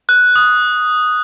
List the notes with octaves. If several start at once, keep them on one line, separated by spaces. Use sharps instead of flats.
F#6
D#6